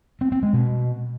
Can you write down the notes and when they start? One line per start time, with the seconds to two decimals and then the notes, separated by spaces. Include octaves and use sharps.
0.21 C4
0.32 C4
0.43 G#3
0.53 B2